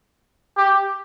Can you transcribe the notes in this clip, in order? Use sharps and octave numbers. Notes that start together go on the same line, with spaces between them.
G4